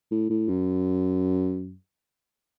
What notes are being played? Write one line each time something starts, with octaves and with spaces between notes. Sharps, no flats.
A2
A2
F#2